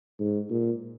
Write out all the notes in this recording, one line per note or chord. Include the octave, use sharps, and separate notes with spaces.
G#2
A#2